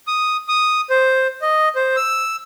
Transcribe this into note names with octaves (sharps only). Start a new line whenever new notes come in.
D#6
D#6
C5
D#5
C5
E6